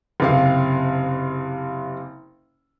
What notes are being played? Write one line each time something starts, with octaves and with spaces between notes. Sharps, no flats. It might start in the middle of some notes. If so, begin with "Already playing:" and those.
F#1 C3 F5